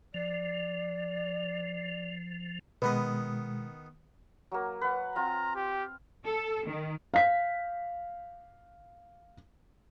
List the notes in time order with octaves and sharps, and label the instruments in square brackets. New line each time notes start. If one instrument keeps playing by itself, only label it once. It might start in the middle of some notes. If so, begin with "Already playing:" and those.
[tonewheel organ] F3 [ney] D5
[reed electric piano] B2 G#3 [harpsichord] D#3 B3 D#5 [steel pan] B4
[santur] F#3 A#3
B4 F#5
[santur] C4 F4 [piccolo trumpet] A#5
[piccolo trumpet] G4
[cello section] A4
D#3
[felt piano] F5 B6